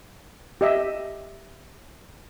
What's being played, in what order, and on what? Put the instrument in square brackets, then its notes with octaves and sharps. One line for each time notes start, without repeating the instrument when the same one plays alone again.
[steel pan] G4 D#5 E5